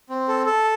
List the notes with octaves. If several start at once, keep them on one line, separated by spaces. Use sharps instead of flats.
C4
A4
A4